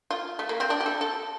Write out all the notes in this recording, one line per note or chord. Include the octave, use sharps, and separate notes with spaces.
F4
A3
A#3
C4
D4
G4
A4
A4